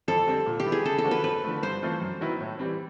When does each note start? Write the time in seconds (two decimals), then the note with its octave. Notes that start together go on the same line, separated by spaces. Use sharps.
0.08 F2 A4
0.27 D3 G3 C4
0.46 A#2
0.60 G4
0.66 G3 B3 E4
0.72 G#4
0.85 C#3 A4
0.98 A4
1.04 F3 A#3 D4 F#4
1.11 B4
1.24 F2 B4
1.43 D3 F3 A3
1.63 G2 C5
1.82 E3 A3 C4 F4
2.01 F#2
2.21 D#3 F#3 B3 E4
2.40 A2
2.59 E3 G3 C4